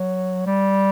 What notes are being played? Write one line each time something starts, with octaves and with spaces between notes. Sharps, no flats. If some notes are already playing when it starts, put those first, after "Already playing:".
Already playing: F#3
G3